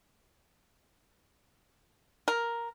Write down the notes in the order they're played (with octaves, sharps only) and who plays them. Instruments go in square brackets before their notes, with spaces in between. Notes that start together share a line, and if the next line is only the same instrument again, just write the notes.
[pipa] A#4